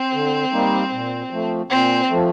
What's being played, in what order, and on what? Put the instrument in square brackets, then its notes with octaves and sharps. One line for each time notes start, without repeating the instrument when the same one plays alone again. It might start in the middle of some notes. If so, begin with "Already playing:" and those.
Already playing: [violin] C4
[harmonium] D3
G3 A#3 D#4
A#2
F3 A3
[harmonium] A#2 [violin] C4
[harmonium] F3 A3